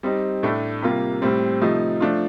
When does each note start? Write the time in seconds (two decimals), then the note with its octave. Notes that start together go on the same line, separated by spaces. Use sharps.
0.03 G3 C4 D#4
0.43 A2 A3 D4
0.82 C3 G3 A#3 F4
1.22 A2 G3 C4
1.61 C3 F3 A3 D#4
2.00 F3 A3 D4 F4